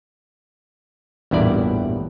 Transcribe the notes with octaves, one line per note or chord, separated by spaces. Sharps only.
A1 E2 G2 A#2 E4 D5